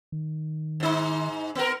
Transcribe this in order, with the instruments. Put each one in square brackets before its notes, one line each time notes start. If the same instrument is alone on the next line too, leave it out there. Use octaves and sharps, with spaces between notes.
[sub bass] D#3
[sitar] G#2 D#4
B3 A#4